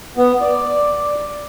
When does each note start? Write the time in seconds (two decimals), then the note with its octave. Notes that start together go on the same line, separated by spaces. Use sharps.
0.17 B3
0.41 D5